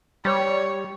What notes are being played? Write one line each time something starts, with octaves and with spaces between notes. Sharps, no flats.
G3 C#5